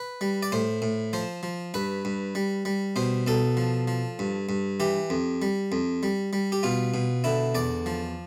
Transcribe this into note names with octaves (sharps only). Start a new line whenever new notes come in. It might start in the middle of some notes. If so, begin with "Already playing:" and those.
Already playing: B4
G3
D5
A2 C5
A2
F3 C5
F3
G2 B4
G2
G3
G3
B2 C5
B2 A4
F3
F3
G2
G2
E3 G4
F2
G3
F2
G3
G3
G4
B2 F4
B2
D3 E4
E2 D5
F3